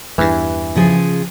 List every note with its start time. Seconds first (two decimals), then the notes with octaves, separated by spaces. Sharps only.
0.18 E2 G2 E3
0.75 C#3 F3 G#4